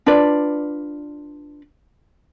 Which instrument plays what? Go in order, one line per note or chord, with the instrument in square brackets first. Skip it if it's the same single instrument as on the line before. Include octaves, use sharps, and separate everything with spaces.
[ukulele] D4 F4 B4 D5